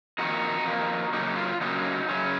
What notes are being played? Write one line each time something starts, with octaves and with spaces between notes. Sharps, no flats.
F2 D#3 A#3 D#4 F#4
F2 D#3 A#3
C#3 F#3 A#3 C#4 D#4
F4
C#3 F#3 A#3 C#4 D#4 F#4
F#2 C#3 F#3 C#4